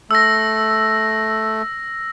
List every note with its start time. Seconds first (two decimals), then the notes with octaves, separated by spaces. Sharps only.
0.11 A3 E6 A#6